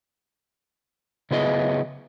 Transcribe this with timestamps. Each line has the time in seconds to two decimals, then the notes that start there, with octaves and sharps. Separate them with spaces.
1.31 C#3 F#3 B3 E4 G#4 D#5